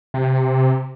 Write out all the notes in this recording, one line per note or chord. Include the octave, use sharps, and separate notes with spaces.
C3